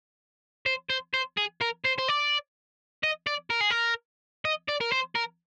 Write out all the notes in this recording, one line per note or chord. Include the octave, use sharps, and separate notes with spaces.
C5
C5
C5
G#4
A#4
C5
C5
D5
D#5
D5
A#4
G#4
A#4
D#5
D5
A#4
C5
A#4